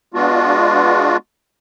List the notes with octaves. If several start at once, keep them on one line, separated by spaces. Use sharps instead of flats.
G#3 B3 D4 F4 F#4